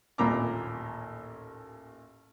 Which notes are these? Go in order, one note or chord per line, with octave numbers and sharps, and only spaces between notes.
A1 D#2 A#2 A#5 B5 D6